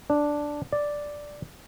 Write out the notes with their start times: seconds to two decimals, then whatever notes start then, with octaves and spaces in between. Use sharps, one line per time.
0.10 D4
0.73 D5